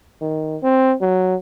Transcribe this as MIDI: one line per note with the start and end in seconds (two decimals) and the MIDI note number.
0.22 0.57 51
0.63 0.95 60
1.01 1.36 54